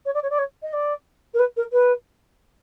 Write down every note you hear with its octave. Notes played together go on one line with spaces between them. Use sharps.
C#5
D5
C#5
D5
C#5
D#5
D5
A#4
B4
A#4
B4